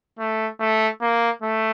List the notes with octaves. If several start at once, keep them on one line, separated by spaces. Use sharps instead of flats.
A3
A3
A#3
A3